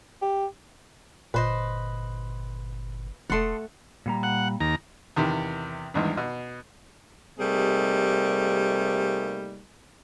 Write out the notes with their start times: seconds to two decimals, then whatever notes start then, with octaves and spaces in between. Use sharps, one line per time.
0.22 G4
1.34 G1 A#2 B4 C5 D#5
3.30 E1 A3 A4 F#5 C6 D#6
4.06 A#2 G3 A#5
4.23 F#5
4.61 D#2 A#5
5.16 E2 C3 D#3
5.94 G#1 E2 G2
6.17 B2
7.39 C3 G3 A3 A#3 D#4 G#4